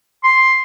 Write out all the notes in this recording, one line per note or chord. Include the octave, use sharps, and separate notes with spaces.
C6